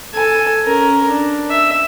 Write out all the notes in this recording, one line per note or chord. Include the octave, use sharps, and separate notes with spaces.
A4 G#5
C#4 A#4
D4
E5